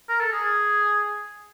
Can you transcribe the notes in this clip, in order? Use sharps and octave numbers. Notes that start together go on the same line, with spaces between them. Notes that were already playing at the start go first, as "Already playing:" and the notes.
A#4
A4
G#4